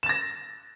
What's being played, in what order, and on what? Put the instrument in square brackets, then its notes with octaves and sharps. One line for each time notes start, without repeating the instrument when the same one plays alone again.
[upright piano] E7
A6
A#6